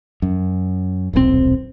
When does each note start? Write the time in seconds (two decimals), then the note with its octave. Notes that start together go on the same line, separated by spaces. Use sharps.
0.22 F#2
1.13 D#1 B1 C3 C4